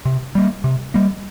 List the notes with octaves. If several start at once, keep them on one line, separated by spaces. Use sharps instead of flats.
C3
G3 A#3
C3
G3 A#3